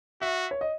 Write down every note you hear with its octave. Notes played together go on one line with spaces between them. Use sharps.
F#4 E5
C#5
D#5